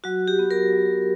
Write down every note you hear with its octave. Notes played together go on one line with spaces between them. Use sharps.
F#3 F#4
G4
B3
A#4
F#3